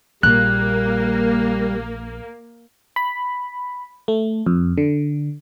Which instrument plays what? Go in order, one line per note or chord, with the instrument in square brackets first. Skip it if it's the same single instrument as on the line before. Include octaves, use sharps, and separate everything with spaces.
[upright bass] A#1 [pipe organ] G3 [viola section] A#3 [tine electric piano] F#6
[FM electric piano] B5
A3
F2
D3